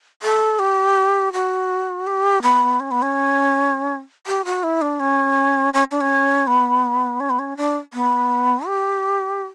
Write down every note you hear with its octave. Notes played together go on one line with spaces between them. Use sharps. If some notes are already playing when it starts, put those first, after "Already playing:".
A4
G4
F#4
G4
B3
C#4
B3
C#4
G4
F#4
E4
D4
C#4
C#4
D4
C#4
B3
C#4
B3
C#4
D4
B3
G4